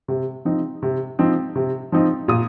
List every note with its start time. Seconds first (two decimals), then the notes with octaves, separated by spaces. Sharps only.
0.08 C3
0.45 F3 C4 D#4
0.83 C3
1.19 F3 C4 D#4
1.56 C3
1.92 F3 C4 D#4
2.28 A#2 D#6